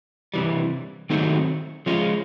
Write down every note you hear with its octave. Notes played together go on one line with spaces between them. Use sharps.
C3 E3 G3
D#3 F#3 A3 C4 D#4
F3 G#3 C#4 F4